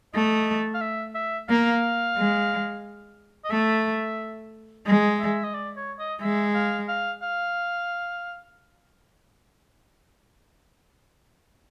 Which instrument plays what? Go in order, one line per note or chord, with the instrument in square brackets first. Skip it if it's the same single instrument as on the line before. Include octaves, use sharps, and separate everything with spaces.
[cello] A3 [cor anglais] D#5
[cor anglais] F5
E5
E5
[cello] A#3 [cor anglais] F5
[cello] G#3
[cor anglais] D#5
[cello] A3 [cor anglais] E5
[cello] G#3 [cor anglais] D#5
[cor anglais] E5
D#5
D5
C#5
D#5
[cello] G#3 [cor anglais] E5
[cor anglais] F5
F5
F5